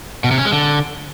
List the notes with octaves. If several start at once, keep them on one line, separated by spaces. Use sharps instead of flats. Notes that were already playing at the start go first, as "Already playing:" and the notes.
B2
C3
C#4
G#3
D3